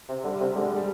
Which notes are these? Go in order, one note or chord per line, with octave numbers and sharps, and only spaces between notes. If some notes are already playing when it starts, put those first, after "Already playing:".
C3
D3 G3
C3
D3 G#3
G3
G3